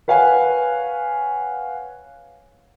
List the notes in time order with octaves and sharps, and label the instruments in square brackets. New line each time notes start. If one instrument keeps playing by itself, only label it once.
[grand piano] B4 C#5 F5 F#5 G#5